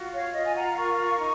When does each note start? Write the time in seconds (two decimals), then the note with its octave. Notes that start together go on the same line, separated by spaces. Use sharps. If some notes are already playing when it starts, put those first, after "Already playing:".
Already playing: F4 F#4
0.13 C#5 F5
0.34 F4 D#5
0.45 G#5
0.55 F#5 A#5
0.76 A#4 A#5 C#6
1.19 D#4